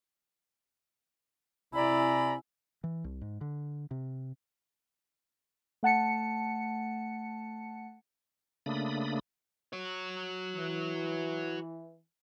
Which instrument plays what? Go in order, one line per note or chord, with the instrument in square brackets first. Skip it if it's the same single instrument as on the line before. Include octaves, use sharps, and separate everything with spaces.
[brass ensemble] C3 G#5 [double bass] E4 [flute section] D5 A#5 B5
[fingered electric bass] E3
C2
G#2
D3
C3
[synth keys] A3 F#5 A5 C#7
[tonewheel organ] C#3 A3 A#3 D4 B5 D#6
[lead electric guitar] F#4 C#5
[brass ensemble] E3